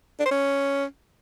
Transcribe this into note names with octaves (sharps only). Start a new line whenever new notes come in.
D4
C5
C#4